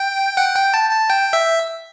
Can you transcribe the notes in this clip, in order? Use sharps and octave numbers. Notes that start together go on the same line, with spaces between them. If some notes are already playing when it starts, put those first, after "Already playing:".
Already playing: G5
F#5
G5
A5
A5
G5
E5